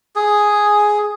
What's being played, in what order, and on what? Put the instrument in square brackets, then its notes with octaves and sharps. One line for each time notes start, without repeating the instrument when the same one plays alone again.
[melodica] G#4